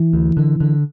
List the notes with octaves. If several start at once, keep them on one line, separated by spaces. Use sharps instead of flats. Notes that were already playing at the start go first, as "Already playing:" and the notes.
Already playing: E3
D2
D3
D3